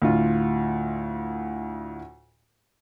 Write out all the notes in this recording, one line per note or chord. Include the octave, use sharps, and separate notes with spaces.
D2 A2 F4